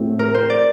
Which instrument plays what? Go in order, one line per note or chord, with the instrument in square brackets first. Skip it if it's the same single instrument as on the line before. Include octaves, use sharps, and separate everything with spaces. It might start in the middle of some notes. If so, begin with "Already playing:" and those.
Already playing: [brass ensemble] A2 A3 C4 [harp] F#4
[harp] A#4
C5
D5